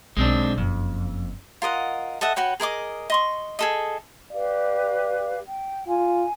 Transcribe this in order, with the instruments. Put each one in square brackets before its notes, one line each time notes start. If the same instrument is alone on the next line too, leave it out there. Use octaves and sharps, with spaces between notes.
[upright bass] B1 [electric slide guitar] G#3 C4 D4
[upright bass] F#1 [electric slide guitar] F2
[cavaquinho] F4 A#4 D#5 F#5
A4 D#5 E5 F#5
F#4 B4 C#5 G5
G#4 A#4 D#5 D6
D#5 C6 C#6
G#4 A4 D#5
[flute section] G4 B4 F5 [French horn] D5
[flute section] G5
[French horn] F4 [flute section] G#5